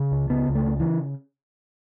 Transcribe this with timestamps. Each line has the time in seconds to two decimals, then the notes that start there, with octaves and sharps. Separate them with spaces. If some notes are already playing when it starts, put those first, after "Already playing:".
Already playing: C#3
0.11 C#2
0.30 C#3 B3
0.49 C#2
0.55 A3
0.68 C#3
0.80 E3